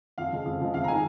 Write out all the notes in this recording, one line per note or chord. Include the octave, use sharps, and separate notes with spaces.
F2 F5
C#3 F3 G#3
F2
C#3 F3 G#3
F2 F5
A#5
D#3 G#3 G#5